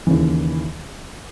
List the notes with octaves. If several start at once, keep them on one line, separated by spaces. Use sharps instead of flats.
D#2 C#3 E3